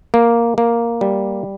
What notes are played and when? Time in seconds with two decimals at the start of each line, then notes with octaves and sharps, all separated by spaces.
0.14 A#3
0.58 A#3
1.01 G3